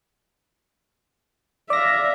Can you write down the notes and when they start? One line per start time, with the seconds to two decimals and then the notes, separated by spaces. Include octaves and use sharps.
1.70 D5 E5 F5 A#6